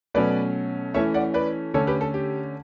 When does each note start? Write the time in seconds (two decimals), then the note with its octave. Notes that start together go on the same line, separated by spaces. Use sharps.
0.14 B2 F#3 A3 C#4 B4 D5
0.94 E3 A3 C#4 C#5 E5
1.14 D5 F#5
1.34 B4 D5
1.74 D3 A3 C#4 A4 C#5
1.87 G4 B4
2.01 A4
2.14 G4